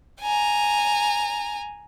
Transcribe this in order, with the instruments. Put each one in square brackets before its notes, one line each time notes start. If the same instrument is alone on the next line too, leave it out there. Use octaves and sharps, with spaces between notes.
[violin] G#5 A#5